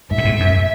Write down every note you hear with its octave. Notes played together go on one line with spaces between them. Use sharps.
G#2 E5
A2
G#2
F#2